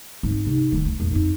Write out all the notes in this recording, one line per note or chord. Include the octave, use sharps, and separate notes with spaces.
G#2 C4
C3 D#4
D1 D#3
D2
E2 A#2
F2 D#4